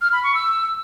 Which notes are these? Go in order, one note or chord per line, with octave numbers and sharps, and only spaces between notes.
F6
B5
C#6
E6